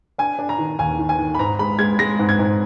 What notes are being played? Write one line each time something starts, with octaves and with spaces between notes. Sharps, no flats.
D4 G#5
D4
A#5
D#3
D#2 G#5
D#3
G#5
D#3
B5
G#2 A#5
G#3 B5
G#3 G#6
G#3 A#6
G#2
G#6
G#2